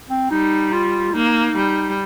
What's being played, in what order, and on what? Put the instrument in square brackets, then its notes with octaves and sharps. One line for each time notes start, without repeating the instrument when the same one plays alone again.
[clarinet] C4
[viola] G3 [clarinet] D#4
[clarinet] F4
[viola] A#3 [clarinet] D#4
[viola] G3